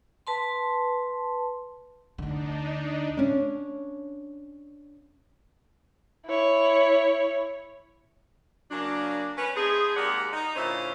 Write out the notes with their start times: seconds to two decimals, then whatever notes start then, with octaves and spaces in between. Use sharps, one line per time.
0.27 B4 A5 C6
2.18 D2 D3 D4 D#4
3.17 C#4 D4
6.26 E4 C#5
8.71 C#3 F#3 A#3 D4
9.37 C#4 B4
9.55 A3 C4 D#4 G#4
9.96 D#2 G#3 G4 A#4 D5 F#5
10.33 D#4
10.55 A#2 D3 C#4 E4 C5